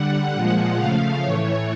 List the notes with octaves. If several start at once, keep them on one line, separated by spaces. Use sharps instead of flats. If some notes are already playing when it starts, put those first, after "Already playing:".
Already playing: D3 G3 F#5
A#2 F3 G#3
C#3 F3 A3 F5
A2 E3 A3 C#5